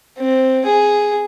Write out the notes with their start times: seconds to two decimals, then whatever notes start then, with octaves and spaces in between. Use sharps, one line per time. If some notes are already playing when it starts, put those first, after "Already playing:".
0.18 C4
0.65 G#4